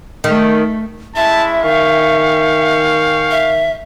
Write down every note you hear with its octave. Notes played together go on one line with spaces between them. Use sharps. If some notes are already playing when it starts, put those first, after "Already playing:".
D#3 A3
G#3 C#4 E4 E5 A5
D#3 F5 G5 G#5 C#6
E5